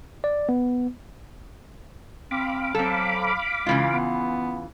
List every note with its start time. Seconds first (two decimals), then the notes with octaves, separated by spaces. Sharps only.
0.24 D5
0.49 B3
2.31 C4 F5 B5 D6
2.75 F#3 C4 A4
3.66 C#3 E3 G#3 F4
3.94 B3